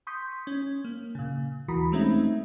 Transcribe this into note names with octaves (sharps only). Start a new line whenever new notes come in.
C6 C#6 D#6 G6 B6
C#4
A#3
A#2 C#3
D#2 E3 F#4 A#5 B5 D#6
G#3 A3 C4 C#4 D#4 E5